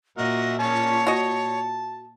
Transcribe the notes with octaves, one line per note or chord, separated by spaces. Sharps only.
A#2 F#4 A#4 D#5 E5
A#3 C#4 C#5 A5
F#4 D#5 A5